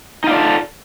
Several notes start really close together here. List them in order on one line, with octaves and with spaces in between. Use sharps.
D#4 F4 D5 A4